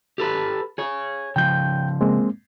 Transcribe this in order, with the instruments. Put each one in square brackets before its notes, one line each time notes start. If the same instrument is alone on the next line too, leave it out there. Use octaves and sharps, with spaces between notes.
[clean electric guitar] G4 A4 B4
G#4 C#5
[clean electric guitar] C#3 F3 [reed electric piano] G5 G6
[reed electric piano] G#3 A#3 C4